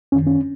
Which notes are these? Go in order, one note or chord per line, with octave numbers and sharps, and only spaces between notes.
F#2 D#3 C#4
C#4